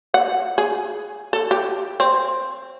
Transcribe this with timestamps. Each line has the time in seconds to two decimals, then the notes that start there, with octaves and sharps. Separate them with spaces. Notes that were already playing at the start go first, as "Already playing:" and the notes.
0.14 F#5
0.58 G#4
1.33 A4
1.51 G4
2.00 C4